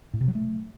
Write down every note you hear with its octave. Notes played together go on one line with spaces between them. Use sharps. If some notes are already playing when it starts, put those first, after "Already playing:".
A2
C3
F#3
A3